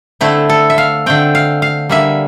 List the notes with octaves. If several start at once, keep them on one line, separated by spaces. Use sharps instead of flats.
D3 A3 C4 E4
A4
E5
F5
D3 A3 C4 G5
F5
F5
D3 G3 A#3 E5